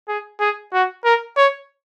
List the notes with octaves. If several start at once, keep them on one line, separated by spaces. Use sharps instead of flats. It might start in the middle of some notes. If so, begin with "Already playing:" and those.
G#4
G#4
F#4
A#4
C#5